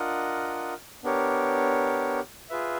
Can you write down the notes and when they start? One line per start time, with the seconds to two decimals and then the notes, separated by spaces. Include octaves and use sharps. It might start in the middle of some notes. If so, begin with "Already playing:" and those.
Already playing: D4 F4 A#4 D#5 F#5
1.03 B3 D4 G4 A#4 C#5
2.50 F4 G#4 B4 E5